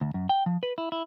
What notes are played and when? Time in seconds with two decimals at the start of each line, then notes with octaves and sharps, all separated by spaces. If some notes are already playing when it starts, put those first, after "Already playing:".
0.01 D2
0.14 F#2
0.29 G5
0.46 F3
0.63 B4
0.78 E4
0.92 E4